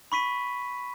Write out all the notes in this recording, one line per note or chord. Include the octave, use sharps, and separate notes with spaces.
B5 C#6 B6 D#7